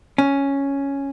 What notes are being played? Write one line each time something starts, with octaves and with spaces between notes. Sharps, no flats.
C#4